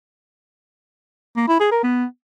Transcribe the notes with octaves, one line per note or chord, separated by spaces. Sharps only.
A#3
E4
G#4
A#4
B3